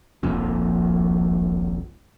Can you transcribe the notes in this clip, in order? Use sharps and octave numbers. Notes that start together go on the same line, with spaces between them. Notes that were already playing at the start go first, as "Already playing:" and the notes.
D#1 A#1 F2 A#2